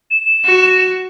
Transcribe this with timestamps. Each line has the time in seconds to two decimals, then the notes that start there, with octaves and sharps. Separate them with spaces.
0.10 E7
0.45 F#4